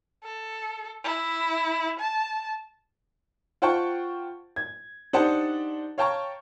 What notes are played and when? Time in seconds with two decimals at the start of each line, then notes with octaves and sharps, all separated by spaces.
0.24 A4
1.04 E4
1.99 A5
3.62 F4 C5 F#5 G5 A5 C#6
4.56 G#6
5.13 D4 D#4 G4 C5 F#5 A5
5.98 C#5 F5 G5 A5 A#5 C#6